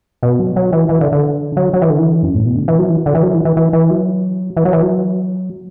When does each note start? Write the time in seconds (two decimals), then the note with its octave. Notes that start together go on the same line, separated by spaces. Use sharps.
0.23 B2
0.39 F#3
0.56 F#3
0.73 E3
0.89 E3
1.01 D3
1.12 D3
1.57 F#3
1.73 F#3
1.82 E3
1.90 D3
1.99 E3
2.23 F#2
2.34 A2
2.45 B2
2.56 D3
2.68 E3
2.79 F#3
2.89 E3
3.06 D3
3.15 E3
3.23 F#3
3.34 E3
3.45 E3
3.57 E3
3.73 E3
3.90 F#3
4.57 E3
4.65 F#3
4.73 E3
4.82 F#3